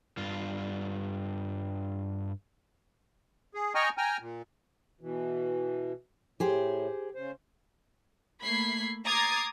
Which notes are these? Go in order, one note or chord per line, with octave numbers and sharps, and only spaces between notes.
G2 F4
G#4
D#5 G5 G#5 A#5 C#6 F6
G5 G#5 A#5 F6
A#2
B2 E3
A2 G4 G#4 C5
C#3 C5
A3 A#3 B5 G#6 B6 C7
A#5 D6 D#6 G#6 A6 C7